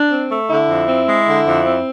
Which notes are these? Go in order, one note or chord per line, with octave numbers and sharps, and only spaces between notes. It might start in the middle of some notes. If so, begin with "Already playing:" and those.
Already playing: D4
C4
A3
D3 E4
F2
C4
G#3
D3
F2
C4